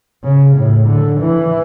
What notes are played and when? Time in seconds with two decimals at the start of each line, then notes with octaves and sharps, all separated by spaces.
0.24 C#3
0.56 A2
0.88 D3
1.20 E3